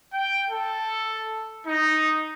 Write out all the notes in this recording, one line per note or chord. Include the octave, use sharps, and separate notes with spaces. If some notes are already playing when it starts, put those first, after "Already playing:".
G5
A4
D#4